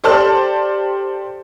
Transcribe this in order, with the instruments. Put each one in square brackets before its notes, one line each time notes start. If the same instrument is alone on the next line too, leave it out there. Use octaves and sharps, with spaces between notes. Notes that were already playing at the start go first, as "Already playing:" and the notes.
[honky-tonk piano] G4 A4 C5 D5 A5 F6